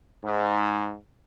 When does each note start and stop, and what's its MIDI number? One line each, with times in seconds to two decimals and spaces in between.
0.22 0.94 44